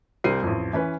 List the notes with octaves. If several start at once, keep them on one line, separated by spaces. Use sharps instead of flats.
C2 G3 C4 C7 D#7
A1 F2
E3 C#4 B4